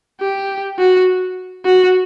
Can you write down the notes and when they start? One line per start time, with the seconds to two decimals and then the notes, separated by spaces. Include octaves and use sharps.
0.20 G4
0.79 F#4
1.66 F#4